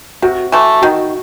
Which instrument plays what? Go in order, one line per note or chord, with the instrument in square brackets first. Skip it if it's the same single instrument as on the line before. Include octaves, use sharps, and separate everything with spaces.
[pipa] C3 [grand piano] F#4
[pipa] E3 A3
[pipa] D#3 [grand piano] F#4